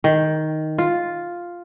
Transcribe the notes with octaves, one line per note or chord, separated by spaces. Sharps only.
D#3
F4